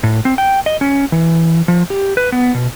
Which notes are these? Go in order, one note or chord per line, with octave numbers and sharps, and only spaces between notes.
A2
C4
G5
D#5
C#4
E3
F3
G4
B4
B3
B2